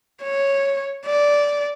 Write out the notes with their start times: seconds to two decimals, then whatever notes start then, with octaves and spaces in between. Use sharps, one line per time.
0.23 C#5
1.06 D5